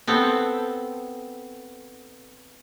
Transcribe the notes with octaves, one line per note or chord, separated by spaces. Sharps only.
B3 C4 A4